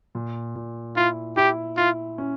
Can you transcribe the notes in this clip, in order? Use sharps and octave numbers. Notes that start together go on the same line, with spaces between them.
A#2
A#2
E4 F4
E4 G4
E4 F4
C#4